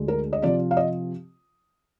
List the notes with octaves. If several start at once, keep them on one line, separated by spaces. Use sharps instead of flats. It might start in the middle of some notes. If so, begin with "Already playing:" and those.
Already playing: D2 D3 G#3
A#4
D#5
C3 F3 C4 F4 D5
F5
D#5